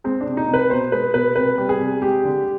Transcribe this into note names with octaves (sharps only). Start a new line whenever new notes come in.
G#3 C4
D4
C3
D#4
C3
B4
B2 C5
G#3 B4
B2 B4
C3 B4
G3
G#4
C3
G#3 G4
D3